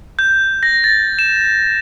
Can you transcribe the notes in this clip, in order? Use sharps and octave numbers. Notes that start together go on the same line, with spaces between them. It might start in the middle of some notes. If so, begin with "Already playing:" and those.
G6
A#6
A6
E7